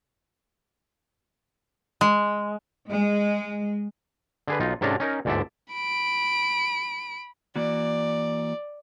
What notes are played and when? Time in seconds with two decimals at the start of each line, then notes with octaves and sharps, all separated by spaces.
2.01 G#3
2.88 G#3
4.47 D3 G#4 B4
4.60 B1 D#4 F4
4.81 G#2 C3 C#4 D4 A4 A#5
5.00 C#4 D#4 A#4
5.25 G1 D2 G#2 A4 D5 E5
5.73 B5 D7
7.56 E3 A#3 F#4 D5